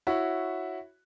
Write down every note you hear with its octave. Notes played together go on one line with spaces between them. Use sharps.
E4 F#4 C#5